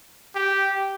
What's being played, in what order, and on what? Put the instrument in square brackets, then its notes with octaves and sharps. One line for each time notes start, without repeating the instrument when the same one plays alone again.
[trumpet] G4